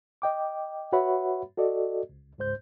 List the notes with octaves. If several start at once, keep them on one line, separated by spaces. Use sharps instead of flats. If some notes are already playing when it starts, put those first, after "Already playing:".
D#5 G5 D6
F#4 B4 C#5 E5 F#5 B5
F#4 A4 D5 D#5
C#2
C#2 G#2 C5 G6